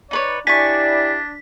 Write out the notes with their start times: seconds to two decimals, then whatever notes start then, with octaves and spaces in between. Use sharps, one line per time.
0.11 D#4 B4 C#5 D5
0.47 D4 E4 G4 D5 G#5 C#6 B6